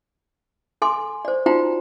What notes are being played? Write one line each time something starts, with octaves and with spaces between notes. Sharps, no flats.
A4 G#5 C6 D6
C5 D5
D#4 F4 F#4 C5 G5 A#5